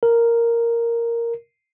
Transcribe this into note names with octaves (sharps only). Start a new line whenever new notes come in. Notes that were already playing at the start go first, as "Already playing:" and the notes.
A#4